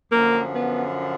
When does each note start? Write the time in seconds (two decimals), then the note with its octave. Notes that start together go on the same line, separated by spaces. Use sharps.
0.12 F#2 D3 F3 A#3
0.54 B3